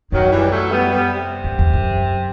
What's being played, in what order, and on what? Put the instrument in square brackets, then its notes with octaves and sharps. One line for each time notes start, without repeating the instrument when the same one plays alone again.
[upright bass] F#2 [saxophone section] D#3 F#3
[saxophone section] E3 G3
F#3 A3
G3 B3
G3 B3
C3
[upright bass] F#2
E2
F#2